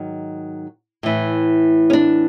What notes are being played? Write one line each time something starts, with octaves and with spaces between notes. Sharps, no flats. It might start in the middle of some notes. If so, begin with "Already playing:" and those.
Already playing: G#2 D#3 F#3
A2 E3
C#4
D4